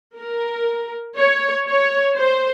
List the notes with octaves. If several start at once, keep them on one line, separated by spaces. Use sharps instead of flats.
A#4
C#5
C#5
C5